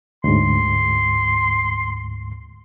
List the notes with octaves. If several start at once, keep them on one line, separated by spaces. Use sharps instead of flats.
D2 G#2 C6